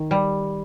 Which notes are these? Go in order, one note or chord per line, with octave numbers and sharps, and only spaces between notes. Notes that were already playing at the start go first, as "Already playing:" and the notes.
Already playing: D#3
G3